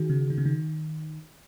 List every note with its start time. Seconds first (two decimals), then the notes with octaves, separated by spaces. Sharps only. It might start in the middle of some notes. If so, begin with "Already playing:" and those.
Already playing: D#3 F#4 G#4
0.10 C#3
0.30 D#3
0.38 C#3
0.45 D#3